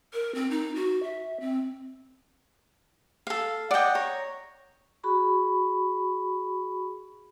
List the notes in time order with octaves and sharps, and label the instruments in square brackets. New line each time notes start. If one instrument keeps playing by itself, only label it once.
[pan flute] A#4
C4
D#4
F#4
E5
C4
[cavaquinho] A4 F5
[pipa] D5 G5 [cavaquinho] D#5 F#5
[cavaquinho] C#5 A#5
[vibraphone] F#4 G#4 B5 C#6